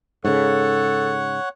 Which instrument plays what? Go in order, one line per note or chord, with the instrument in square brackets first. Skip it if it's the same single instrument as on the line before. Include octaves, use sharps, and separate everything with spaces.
[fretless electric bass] G#2 C#3 [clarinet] A4 [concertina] C#5 F#5